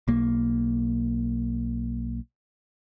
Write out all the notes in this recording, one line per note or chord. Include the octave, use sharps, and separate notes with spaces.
B1 A#3